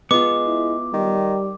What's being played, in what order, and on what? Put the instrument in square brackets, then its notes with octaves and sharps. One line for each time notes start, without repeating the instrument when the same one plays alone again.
[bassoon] G#3 [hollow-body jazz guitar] B3 F4 [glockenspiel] D6
[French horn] E4
[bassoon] D#3 [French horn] G3